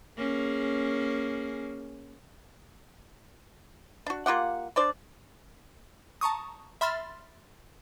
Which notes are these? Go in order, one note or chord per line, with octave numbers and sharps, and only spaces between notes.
A#3 C#4 G#4
D4 F#4
A#3 F4 G4 F#5
D4 C5 D5
A5 A#5 C#6 D#6
E5 B5 C6 F6 A6